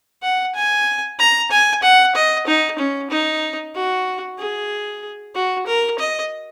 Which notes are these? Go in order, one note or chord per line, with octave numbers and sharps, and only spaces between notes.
F#5
G#5
A#5
G#5
F#5
D#5
D#4
C#4
D#4
F#4
G#4
F#4
A#4
D#5